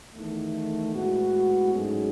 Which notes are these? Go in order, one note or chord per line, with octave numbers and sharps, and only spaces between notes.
E2 D#3 A3
A2 G#3 B3 F#4
G#2 F#3 A3 C#4 G#4